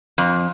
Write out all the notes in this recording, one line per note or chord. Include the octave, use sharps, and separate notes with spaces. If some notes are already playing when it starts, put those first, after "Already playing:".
F2